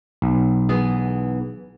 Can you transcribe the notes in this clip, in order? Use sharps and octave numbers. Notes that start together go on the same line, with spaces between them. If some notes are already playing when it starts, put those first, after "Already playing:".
B1
E3 B3 G#4